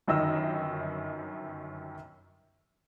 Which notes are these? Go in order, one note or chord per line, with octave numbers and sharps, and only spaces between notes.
G1 F#2 D#3 D#5 E6